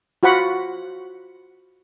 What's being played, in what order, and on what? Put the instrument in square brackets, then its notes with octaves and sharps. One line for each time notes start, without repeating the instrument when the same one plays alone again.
[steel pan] F4 F#4 C5 F#5 B5